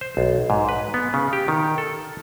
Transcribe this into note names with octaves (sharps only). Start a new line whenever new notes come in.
C5
B1
G#2
B4
B3
C#3
G4
D#3
A4